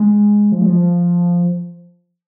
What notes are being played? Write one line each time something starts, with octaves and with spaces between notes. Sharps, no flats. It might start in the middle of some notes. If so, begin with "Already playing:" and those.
Already playing: G#3
F3
G#3
F3